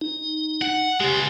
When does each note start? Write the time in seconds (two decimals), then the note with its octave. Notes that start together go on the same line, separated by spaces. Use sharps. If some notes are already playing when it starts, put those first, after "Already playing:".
0.01 D#4
0.62 F#5
1.00 C#2 G#3 G4